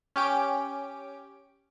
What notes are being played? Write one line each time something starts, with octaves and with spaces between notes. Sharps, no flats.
C#4 G4 D7